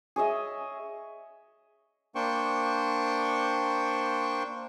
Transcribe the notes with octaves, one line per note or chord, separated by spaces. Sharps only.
G#4 C#5 D#5 E5
A#3 D4 C5 G5 C#6